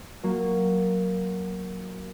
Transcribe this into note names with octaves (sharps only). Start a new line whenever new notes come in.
F#3 A#3 F#4